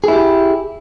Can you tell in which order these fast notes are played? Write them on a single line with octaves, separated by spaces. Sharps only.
G#4 E4 G4